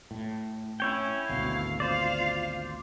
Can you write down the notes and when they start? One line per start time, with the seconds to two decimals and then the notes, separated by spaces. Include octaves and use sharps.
0.11 A2
0.80 C#4 E4 C#5 G5
1.29 G#1 D2 G#2 B2 F5
1.80 F4 C5 D5 F5